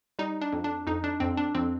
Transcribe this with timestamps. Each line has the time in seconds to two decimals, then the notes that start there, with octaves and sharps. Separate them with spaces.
0.19 G3 D#4
0.41 D4
0.52 F2
0.64 D4
0.87 F2 D#4
1.04 D4
1.20 F2 C4
1.37 D4
1.55 F2 C4